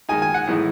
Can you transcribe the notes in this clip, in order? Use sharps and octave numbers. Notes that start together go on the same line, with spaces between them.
D#3 G#3 D#4 G#5
G#5
F#5
A2 E3 G#3 D#4